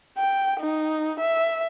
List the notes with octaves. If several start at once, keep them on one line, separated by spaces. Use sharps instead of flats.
G5
D#4
E5